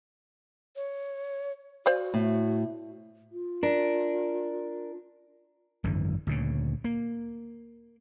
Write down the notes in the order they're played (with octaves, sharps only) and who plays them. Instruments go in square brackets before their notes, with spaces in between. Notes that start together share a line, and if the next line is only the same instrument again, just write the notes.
[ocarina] C#5
[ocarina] F#4 [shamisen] C5 D5 F5
[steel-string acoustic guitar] A2
[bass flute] F4
[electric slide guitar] D4 [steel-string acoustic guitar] A#4
[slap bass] G#1 F#2 D3 E3
D2 A#2 C#3
A#3